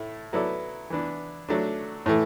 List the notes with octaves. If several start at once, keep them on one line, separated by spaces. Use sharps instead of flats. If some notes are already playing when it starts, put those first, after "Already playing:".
Already playing: A2 A3 E4
F#3 B3 E4 A4 D5
E3 B3 D4
F#3 A3 D4
A2 E3 A3